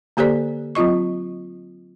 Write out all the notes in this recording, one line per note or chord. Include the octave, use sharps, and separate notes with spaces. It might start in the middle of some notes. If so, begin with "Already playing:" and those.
D3 A#3 G4 A4 C5 D5
F#3 C4 F4 D#5 C#6